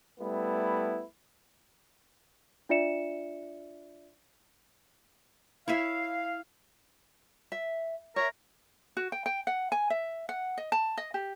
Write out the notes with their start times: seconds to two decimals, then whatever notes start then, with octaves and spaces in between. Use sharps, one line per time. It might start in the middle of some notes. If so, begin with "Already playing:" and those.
0.20 G3 A3 B3 E4
2.69 D4 F4 D5 E5 C#7 E7
5.68 E4 C#5 E5 F5
7.52 E5
8.16 A#4 C#5 E5
8.97 F#4
9.12 G5
9.26 G5
9.47 F#5
9.72 G#5
9.90 E5
10.29 F#5
10.58 D#5
10.72 A5
10.98 D#5
11.14 G4